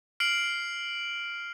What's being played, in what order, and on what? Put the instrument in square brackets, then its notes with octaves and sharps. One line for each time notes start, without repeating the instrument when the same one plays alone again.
[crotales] F6 C7 D7 F#7